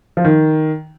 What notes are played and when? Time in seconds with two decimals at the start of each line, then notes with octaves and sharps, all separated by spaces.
0.17 F3
0.25 D#3